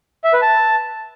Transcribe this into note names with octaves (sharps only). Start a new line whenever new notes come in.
E5
B4
A5